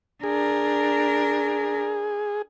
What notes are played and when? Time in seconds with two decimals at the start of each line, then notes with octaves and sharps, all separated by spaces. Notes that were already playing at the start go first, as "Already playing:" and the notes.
0.23 D4 G#4 A#4